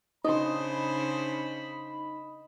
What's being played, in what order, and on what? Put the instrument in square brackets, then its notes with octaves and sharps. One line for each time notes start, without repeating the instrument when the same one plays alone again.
[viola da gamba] C#3 D4 C5 [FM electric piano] D#4 [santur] D#5 C6 [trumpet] B5